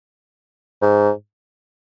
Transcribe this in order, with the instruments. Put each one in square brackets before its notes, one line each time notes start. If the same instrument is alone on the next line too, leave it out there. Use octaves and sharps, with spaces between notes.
[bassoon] G#2